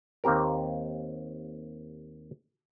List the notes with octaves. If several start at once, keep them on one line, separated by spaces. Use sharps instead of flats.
D#2 A#3 C4 G4 A#4